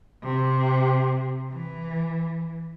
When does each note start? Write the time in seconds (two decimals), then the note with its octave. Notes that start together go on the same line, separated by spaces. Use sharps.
0.23 C3
1.51 E3